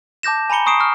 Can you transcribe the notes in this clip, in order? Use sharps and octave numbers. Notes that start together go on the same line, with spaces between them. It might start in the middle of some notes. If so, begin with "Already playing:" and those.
A5 D6 G6 A#6 E7
G#5 A#5 B5 C#7 G7
A#5 C#6 D#6 C7 D7 E7
C#6 F6